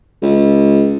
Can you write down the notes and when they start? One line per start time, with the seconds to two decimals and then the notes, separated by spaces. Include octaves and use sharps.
0.22 C#2